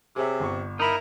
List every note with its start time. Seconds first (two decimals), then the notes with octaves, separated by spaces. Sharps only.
0.16 C3 G#4 C#5 E5
0.40 G1 C#6
0.80 D#4 E4 A#4 B5